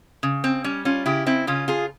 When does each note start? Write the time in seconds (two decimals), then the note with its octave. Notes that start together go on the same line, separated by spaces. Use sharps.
0.23 C#3
0.44 C4
0.64 G3 C#4
0.85 C#4 F4
1.06 C#3 E4 G4
1.26 C4 E4
1.47 C#3 C#4 F4
1.68 F4 G#4